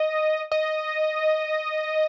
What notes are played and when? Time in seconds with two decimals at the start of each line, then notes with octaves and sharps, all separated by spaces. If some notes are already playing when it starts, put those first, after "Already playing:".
Already playing: D#5
0.51 D#5